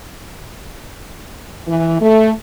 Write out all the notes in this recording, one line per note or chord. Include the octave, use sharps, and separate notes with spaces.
E3
A3